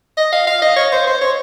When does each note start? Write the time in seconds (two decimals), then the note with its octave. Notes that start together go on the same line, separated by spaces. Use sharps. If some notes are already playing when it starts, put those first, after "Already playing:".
0.17 D#5
0.32 F5
0.47 F5
0.62 D#5
0.76 C#5
0.92 C5
1.07 C5
1.21 C#5